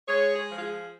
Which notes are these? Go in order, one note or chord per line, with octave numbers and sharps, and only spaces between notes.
G#3 G#4 C#5
G#4
F3
F4
G#4